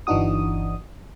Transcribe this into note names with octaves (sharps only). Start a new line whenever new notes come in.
G1 E3 D4 D#4 F#4 D#6